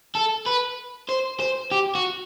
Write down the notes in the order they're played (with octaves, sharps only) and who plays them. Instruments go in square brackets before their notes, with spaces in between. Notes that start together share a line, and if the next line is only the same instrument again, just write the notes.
[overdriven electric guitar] A4
B4
C5
C5
G4
F#4